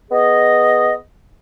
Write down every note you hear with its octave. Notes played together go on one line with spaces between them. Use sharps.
B3 G#4 D#5